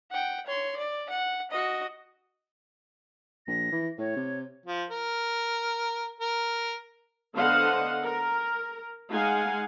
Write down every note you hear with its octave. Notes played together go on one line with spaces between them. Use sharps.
F#5 G5
C#5 C6
D5
F#5
F#4 D#5
A#1 A#6
E3
A2 C#5
C3
F3
A#4
A#4
D3 B3 C5 D#5 F5 F#5
A#4
G#3 D#4 F5 F#5 G#5